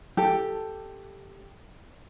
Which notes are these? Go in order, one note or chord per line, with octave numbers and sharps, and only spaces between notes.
G4 A4 A5